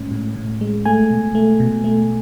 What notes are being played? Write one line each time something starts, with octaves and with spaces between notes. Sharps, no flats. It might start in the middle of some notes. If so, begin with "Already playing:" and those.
Already playing: A2 G#3 C#4
A2
A2
G#3
A3 G#5
B2
A3
B2
A3